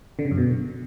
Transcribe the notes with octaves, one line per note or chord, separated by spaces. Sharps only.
D3
C#3
F#2
B2